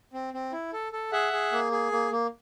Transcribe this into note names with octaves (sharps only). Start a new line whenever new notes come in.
C4
C4
E4
A4
A4
G#4 E5 F#5
G#4
A#3
G#4
A#3
A#3